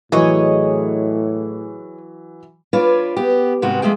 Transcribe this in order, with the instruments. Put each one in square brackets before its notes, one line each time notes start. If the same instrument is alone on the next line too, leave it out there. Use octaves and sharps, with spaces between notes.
[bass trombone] A2 [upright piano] E3 F#3 [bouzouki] G#4 C#5 D#5
[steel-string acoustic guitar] D4 F4 B4 C#5 D5
B3 G4
G#2 C3 D#3 B3 F#4
F2 G#3 A3 G#4 G5